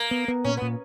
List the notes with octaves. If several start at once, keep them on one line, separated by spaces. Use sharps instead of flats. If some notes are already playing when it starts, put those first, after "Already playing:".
Already playing: A#3
B3
B3
A#2 C#4
B3
A#2